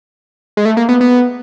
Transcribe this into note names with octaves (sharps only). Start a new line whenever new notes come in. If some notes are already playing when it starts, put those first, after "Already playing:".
G#3
A3
A#3
B3
B3